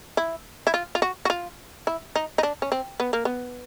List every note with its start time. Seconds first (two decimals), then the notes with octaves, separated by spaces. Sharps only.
0.17 E4
0.67 E4
0.74 F4
0.95 F4
1.02 F#4
1.25 F#4
1.30 F4
1.87 E4
2.16 D#4
2.38 D#4
2.43 D4
2.62 C#4
2.72 C4
3.00 B3
3.13 A#3
3.25 B3